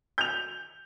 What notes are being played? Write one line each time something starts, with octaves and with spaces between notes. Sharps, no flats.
G6 F7